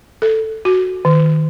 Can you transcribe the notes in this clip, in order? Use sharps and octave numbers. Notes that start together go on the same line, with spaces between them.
A4
F#4
D#3